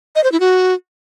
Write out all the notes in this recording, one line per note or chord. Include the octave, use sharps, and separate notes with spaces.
D#5
C5
E4
F#4